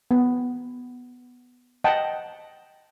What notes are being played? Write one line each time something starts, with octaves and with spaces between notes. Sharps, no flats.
B3
D#5 F#5 G5 A5